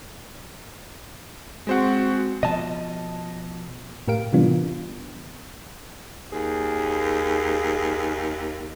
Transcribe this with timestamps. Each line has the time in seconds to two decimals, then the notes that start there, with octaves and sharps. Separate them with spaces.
1.67 G#3 C4 F#4 C5 F#5
2.43 B2 F3 D#5 A5
4.08 A2 G4 A#4 F5 D7
4.33 C3 E3 G3 B3 D4 F4
6.32 D#2 G#4